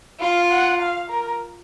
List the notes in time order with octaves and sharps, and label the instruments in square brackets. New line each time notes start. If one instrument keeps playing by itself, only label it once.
[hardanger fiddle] F4 [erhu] F5
[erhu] F#5
F5
A#4